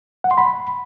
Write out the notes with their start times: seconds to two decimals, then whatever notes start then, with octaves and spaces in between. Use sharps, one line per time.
0.24 F#5
0.31 C6
0.38 B5